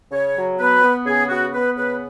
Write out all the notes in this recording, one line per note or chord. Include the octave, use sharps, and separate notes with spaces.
C#3 C#5
F#3
B3 B4
B3
C#3 G#4
B3 F#4
B3 B4
C#3 B4